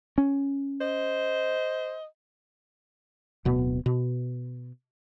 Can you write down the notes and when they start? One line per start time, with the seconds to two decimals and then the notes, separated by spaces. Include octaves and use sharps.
0.18 C#4
0.81 C5 D#5
3.45 D1 B2 B3
3.86 B2